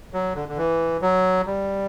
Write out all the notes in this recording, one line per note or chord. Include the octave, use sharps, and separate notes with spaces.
F#3
D3
D3
E3
F#3
G3